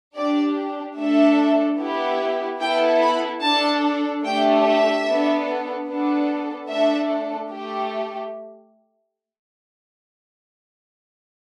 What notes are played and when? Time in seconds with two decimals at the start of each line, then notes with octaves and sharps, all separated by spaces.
0.16 D4 G4 D5
0.97 A3 D4 A4 E5
1.79 B3 E4 G4
2.61 B3 E4 A4 G5
3.02 B5
3.42 D4 A4 A5
4.24 A3 D4 G4 G5
4.65 E5
5.05 B3 D4 A4
5.87 B3 D4 A4
6.68 A3 D4 A4 E5
7.50 A3 G4